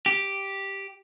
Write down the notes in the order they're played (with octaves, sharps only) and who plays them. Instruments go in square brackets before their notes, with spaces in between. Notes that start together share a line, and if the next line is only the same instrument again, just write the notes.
[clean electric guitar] G4